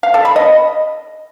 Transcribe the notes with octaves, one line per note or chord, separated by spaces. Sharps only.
F5
A4
B5
D#5